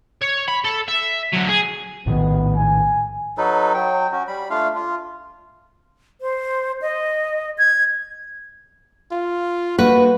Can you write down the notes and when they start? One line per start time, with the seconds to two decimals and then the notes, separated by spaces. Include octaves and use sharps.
0.21 C#5
0.48 B5
0.64 A4
0.88 E5
1.33 D3 F#3
1.49 G#4
2.06 A#1 A2 D#3 B3
2.56 G#5
3.38 F#3 D#4 A4 B4
3.74 F#3 G5
4.12 C#4 F#4
4.28 G3 B5
4.50 A3 D4 F4 F5
4.75 F4
6.21 C5
6.82 D#5
7.58 G#6
9.11 F4
9.79 G3 A#3 F#4 B4 F5